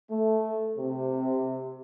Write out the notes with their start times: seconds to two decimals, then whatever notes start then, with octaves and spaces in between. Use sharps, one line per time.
0.10 A3
0.77 C3